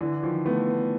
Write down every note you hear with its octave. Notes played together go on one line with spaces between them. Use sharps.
D3 E3
D#3 F3
A3 B3